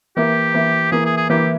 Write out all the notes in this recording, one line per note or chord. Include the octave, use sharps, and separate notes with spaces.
E3 A#3 E4 G4
E3 A#3 E4
E3 A#3 E4 G#4
G#4
G#4
E3 A#3 E4 G4